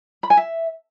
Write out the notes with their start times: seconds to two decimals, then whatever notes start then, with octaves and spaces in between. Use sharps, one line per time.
0.23 B5
0.30 G#5
0.37 E5